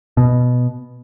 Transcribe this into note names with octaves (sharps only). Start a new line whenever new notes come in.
B2